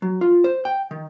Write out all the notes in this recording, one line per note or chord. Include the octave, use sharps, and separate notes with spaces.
F#3
F4
C5
G5
D#3